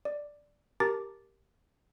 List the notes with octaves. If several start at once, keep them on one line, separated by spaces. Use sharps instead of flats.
D5
G4 A#4 A5 A#5 D6 A6